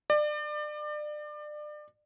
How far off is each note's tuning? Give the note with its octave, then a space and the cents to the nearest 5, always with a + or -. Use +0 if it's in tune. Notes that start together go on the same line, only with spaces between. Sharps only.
D5 +30